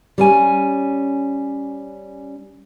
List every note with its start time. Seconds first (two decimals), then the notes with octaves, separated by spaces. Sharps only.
0.18 G3 C#4 G#5